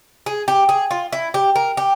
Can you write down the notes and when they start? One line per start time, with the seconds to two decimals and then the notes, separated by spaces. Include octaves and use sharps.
0.26 G#4
0.48 G4
0.69 G#4
0.91 F4
1.12 E4
1.34 G4
1.56 A#4
1.77 G4